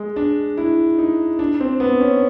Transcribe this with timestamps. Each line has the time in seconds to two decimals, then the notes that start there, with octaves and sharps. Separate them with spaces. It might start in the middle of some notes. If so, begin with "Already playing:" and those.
Already playing: G#3
0.16 D4
0.57 E4
0.98 D#4
1.39 D4
1.60 C4
1.80 B3
2.01 C#4